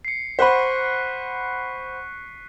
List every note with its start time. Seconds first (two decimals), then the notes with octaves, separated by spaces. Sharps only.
0.05 C7 C#7
0.39 C5 F#5 B5 C#6 F#6 B6